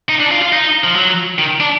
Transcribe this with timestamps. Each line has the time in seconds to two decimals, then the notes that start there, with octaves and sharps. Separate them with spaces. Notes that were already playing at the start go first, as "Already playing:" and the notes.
0.09 D#4
0.20 D4
0.31 F4
0.42 F4
0.53 D#4
0.84 F3
0.95 F#3
1.39 D#3
1.60 D4